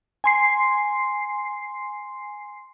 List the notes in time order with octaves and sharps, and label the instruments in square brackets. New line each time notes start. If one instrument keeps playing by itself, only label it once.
[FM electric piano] G#5 C6 C7